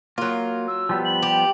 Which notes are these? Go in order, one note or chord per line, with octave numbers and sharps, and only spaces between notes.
F#3 A#3 F4
E6
F3 G3 B3
F#7
G4